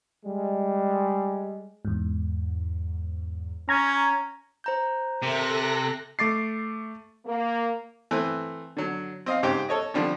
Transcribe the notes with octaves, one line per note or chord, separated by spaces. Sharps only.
G3 G#3
E2 G#2
C#4 A#5 G#6
C5 A#5 G6
C3 A4 A#4 E5 F#6 A#6
A3 D6 A6 C7
A#3
E3 A3 C4 B4
D3 F#3
C4 D#5 F5
G#2 C#3 G4 C5 G5
A4 C#5 D#5
D3 F3 G3 D4